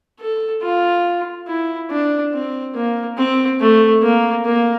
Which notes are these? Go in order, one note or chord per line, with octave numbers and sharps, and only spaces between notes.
A4
F4
E4
D4
C4
A#3
C4
A3
A#3
A#3